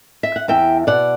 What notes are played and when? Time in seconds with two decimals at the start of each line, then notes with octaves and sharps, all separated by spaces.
0.23 E5
0.36 F#5
0.48 E2 E5 G5
0.87 B2 D5 F#5